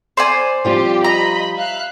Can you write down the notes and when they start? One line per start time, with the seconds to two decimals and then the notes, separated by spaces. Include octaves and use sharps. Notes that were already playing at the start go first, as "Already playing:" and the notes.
0.17 C5 D5 G#5
0.65 F3 G3 C4 F4 G4
1.04 D#5 A#5 B5
1.55 E5 F5 F#6